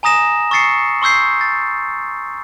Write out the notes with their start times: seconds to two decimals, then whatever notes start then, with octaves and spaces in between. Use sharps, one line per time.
0.03 G#5 A#5 D#6 A#6 E7
0.51 C#6 E6 A6 C7 C#7
1.02 C6 C#6 E6 G6 C7
1.41 A6